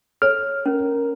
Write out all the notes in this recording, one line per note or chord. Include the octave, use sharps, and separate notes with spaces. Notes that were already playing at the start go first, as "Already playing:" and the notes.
A4 C#5 F6
C#4 A#4